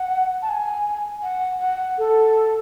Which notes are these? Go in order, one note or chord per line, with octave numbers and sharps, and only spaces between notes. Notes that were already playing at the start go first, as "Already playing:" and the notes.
Already playing: F#5
A5
G#5
F#5
F#5
A4